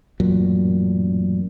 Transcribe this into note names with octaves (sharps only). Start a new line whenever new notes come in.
A1 F#2 A#2 F#3